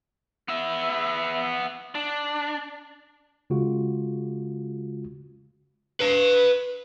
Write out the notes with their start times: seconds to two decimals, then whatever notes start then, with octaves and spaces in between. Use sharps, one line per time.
0.48 B3 E5
1.95 D4
3.50 C#3 G#3 F4 F#4
6.01 B4 F5